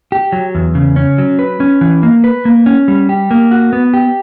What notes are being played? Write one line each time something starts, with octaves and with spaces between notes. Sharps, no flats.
G4
F#3
E2
C#3
C#4
F#3
B4
C#4
E3
A#3
B4
A#3
C#4
G3
G4
A#3
F#4
B3
G4